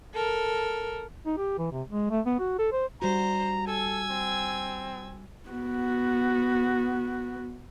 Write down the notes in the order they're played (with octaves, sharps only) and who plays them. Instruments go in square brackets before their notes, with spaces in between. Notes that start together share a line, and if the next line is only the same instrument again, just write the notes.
[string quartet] A4 A#4
[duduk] D#4
G4
E3
C3
G#3
A3
B3
F#4
A4
C5
[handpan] G3 F#4 [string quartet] C5 [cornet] A#5
[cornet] A4 [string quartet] G#5 E6 G#6
[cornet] C4
[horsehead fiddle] B3 F#4